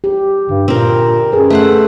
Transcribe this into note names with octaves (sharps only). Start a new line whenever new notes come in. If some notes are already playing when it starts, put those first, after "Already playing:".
G4
G2 D3
A#2 C4 A#4
F#2 G#4 B4
A3 C5 F#5